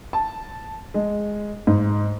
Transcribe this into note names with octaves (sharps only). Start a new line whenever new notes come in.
A5
G#3
G#2